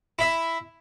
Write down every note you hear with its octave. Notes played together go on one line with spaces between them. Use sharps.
E4 E5